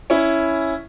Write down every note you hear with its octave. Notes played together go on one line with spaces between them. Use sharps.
C#4 E4